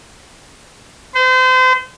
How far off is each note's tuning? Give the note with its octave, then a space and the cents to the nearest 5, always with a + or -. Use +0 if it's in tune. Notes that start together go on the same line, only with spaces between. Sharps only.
C5 -35